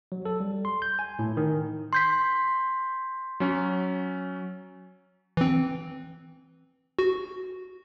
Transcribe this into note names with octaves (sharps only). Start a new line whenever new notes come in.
F#3
A4
G3
C6
G6
G#5
A2
D#3
C6 G6 B6
F#3 C#4
E3 C4
F#4